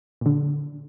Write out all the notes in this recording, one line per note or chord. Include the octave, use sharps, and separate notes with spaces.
A#2 D3